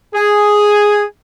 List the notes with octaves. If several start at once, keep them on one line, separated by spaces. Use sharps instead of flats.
G#4